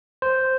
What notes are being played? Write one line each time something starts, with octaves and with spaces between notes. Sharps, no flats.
C5